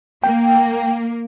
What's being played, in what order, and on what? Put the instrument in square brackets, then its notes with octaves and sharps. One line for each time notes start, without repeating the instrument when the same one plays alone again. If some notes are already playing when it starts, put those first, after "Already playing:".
[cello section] A#3 [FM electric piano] G5